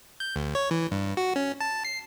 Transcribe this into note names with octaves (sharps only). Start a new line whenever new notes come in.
G6
D2
C#5
E3
G2
F#4
C#4
A5
C7